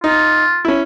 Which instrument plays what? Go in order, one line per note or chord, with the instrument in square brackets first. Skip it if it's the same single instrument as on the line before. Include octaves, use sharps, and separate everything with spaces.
[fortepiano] D#4 [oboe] F4
[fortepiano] C#4 E4